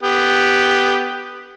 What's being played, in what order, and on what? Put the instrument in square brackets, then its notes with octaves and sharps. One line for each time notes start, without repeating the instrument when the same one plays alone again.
[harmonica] B3 G4